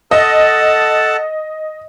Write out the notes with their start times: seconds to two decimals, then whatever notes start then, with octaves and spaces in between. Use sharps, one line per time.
0.11 A4 D#5 F#5 A5